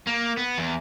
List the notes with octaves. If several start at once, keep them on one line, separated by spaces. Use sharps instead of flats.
A#3
B3
E2